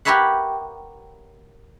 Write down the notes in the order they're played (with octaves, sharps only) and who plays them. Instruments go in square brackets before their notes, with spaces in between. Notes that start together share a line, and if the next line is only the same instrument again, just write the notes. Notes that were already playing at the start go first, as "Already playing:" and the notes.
[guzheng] G4 A#4 B4 C#5 E5 F#5